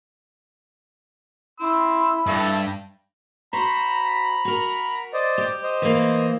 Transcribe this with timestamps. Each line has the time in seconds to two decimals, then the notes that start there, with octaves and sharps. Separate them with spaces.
1.60 E4 C6 E6
2.27 G2 A4 E5
3.53 F#4 C5 A#5 B5
4.45 F#4 A#4
5.13 C5 D5 D#5
5.38 G4
5.63 C5 D#5
5.82 E3 A#3